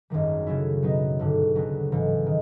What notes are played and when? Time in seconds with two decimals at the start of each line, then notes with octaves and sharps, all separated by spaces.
0.10 G#1 F#2 D#3 G3
0.47 C#3 F#3 A3 C#4 E4
0.83 B2 F#3 B3 D#4
1.19 G#1 G2 D3
1.55 D2 C#3 F#3 B3
1.92 A1 G#2 E3
2.26 D#3